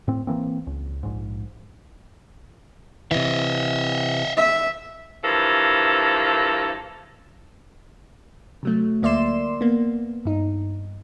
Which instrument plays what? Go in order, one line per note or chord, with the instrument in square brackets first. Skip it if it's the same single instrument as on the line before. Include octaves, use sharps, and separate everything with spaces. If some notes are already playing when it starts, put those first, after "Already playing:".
[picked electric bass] A2 C4
E3 A#3 C4
C#2
A#1 G#2
[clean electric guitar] C3 E3 [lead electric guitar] D#5 E5
[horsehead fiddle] E5
[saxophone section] G2 E3 F3 A4 A#4
[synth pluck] C3 F#3 A3
D2 A#3 D5 E5 C6 E7
A#3 B3
G2 D#4